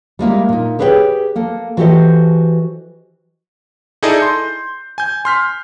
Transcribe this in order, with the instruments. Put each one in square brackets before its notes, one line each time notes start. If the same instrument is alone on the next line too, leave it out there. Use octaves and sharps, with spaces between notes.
[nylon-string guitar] G3 G#3 A#3 E4
A#2 D#4
G4 G#4 B4 C#5 E5 G5
A#3 A4
E3 F#4 G4 A4 C5 D#5
[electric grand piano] D#4 E4 G#4 A4 D5 D#5
C6 G6
G#5 G6
C6 F6 B6